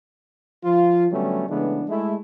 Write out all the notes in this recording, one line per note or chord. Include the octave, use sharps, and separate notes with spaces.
F3 F4
D3 F#3 G3 A3 B3 C#4
C#3 E3 G#3 A3 B3 D4
G#3 A3 E4